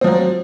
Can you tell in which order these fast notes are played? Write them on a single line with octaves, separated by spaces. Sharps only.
C4 F3 F#3